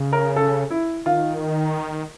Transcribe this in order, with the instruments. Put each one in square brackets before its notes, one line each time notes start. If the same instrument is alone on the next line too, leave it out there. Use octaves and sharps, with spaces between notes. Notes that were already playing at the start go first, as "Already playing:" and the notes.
Already playing: [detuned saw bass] C#3
[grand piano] A#4
A4
E4
[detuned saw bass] D#3 [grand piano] F4